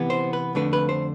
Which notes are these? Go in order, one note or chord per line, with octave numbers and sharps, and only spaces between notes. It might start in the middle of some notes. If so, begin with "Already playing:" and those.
Already playing: C3 E3 B3
C5
B4
F2 D3 A3 D4 B4
B4
C5